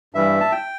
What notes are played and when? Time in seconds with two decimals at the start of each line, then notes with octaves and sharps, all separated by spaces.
0.14 G2 E3 G3 E5
0.40 A5
0.52 G5